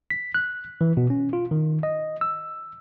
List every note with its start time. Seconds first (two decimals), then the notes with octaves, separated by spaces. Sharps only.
0.10 B6
0.35 F#6
0.81 E3
0.97 B2
1.10 C#4
1.33 F4
1.51 D#3
1.83 D#5
2.21 E6